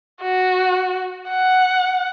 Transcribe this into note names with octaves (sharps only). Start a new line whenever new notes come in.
F#4
F#5